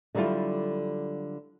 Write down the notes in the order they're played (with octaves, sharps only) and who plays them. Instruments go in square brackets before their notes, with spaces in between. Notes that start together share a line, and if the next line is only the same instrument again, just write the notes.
[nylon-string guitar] D3 F#3 G3 E4 F4 A4